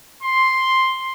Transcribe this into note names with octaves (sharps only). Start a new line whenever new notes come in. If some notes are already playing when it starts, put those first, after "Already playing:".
C6